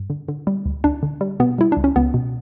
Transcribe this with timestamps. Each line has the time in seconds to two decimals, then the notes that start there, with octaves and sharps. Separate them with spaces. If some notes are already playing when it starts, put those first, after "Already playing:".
Already playing: G2
0.10 D3
0.28 D3
0.47 G3
0.66 D2
0.84 D2 D4
1.03 D3
1.21 G3
1.40 B2 B3
1.58 G3 E4
1.72 C#2 D4
1.84 C#4
1.96 C#2 B3
2.14 B2